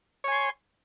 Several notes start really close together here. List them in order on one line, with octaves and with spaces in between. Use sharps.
C#5 G#5 C6